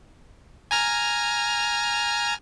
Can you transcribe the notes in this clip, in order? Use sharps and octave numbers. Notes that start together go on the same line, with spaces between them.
G#5 A#5 F6